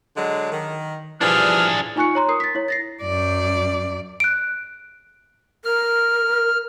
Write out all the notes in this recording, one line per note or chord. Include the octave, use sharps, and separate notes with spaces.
D3 F#3 G#3
D#3
E3 F3 G3 D4 G#4 F6
D#4 F4 G#5 C#6 F#6 C#7
C#5 A#5 C6
A#4 D#6 C7
A6 B6
E4 C#5
A6 A#6 C7
F#2 D5
F#6 D7
A#4 F6